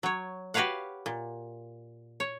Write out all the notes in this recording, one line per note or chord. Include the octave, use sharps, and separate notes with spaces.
F#3 C#5
F#4 G4 B4 C#5 F5 F#5
A#2
C#5